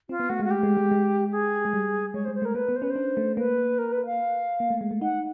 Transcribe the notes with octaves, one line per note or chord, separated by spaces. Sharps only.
C4 F4
B3
A3 F#4
G#3
F#4
G4
G#3
G#3
G#3
G#4
G#3
G3
G#3 C#5
C5
G#3
C5
A3
A#4
A#3 B4
B3
C5
C#4 B4
C5
D4
A3
A#3 B4
A#4
B4
F5
A#3
A3
G#3
A3
D#4 F#5